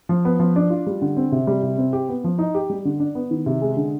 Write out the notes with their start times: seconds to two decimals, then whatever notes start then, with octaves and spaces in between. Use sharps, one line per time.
0.09 F3
0.25 B3
0.39 F3
0.56 D4
0.70 F4
0.87 G3
1.02 D3
1.17 C4
1.32 C3
1.47 G3
1.63 C3
1.78 C4
1.93 G4
2.09 B3
2.24 F3
2.38 D#4
2.55 G4
2.70 G3
2.85 D3
3.00 D4
3.15 B3
3.31 D#3
3.46 C3
3.62 G#3
3.77 D3